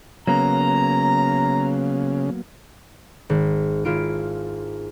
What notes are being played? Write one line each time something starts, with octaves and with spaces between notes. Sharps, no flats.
C#3 F#3 A#3 B3 A#5
G#1
G#1 E4 F4 D7